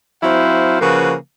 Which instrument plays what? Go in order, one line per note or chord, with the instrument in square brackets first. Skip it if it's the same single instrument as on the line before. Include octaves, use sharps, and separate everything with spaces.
[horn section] F#3 C4 E4 C5 F5
C#3 F3 A#3 F#4 B4